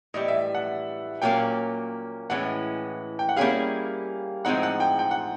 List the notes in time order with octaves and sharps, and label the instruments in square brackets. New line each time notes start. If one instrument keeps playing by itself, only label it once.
[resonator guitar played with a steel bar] A2 E3 G3 [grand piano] D#5
[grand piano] E5
F#5
[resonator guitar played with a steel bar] A#2 F#3 A#3 C#4 [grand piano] G5
[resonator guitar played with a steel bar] A2 E3 G#3 C#4 [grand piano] F#5
[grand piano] G5
F#5
[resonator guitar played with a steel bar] G3 A#3 C#4 E4 G#4 [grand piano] F5
[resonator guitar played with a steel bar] A2 F3 G#3 C4 D#4 [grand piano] F#5
[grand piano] F#5
G5
G5
F#5